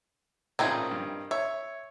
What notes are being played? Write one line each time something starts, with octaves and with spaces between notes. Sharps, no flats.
A1 A#2 D#3 C4 G#4
G2
C#5 E5